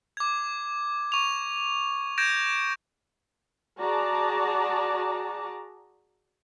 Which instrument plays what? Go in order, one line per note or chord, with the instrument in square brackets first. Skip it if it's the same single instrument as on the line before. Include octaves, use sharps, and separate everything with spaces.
[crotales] D6 G#6
C#6 F7
G6 G#6 A#6 D7 E7
[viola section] F#4 G#4 D5 A5 A#5